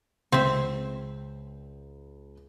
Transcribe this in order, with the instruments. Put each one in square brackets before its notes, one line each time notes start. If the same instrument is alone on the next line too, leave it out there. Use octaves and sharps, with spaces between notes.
[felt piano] C#2 [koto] C4 E5